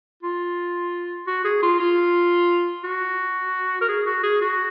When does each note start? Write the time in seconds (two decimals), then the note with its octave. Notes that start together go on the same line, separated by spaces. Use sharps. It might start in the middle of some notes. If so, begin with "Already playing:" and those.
0.23 F4
1.27 F#4
1.45 G#4
1.63 F4
1.80 F4
2.84 F#4
3.81 A#4
3.89 G#4
4.06 F#4
4.23 G#4
4.41 F#4